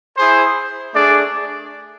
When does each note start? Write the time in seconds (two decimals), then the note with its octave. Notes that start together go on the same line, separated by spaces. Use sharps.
0.16 E4 G#4 C5
0.94 A3 D4 G#4 D5